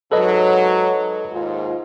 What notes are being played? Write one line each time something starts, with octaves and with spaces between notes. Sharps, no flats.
G#2 F#3 A4 B4 D#5
D#2 G#2 F4